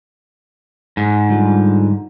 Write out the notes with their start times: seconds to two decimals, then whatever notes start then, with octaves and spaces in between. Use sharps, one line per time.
0.97 G#2
1.29 D3 G3 F4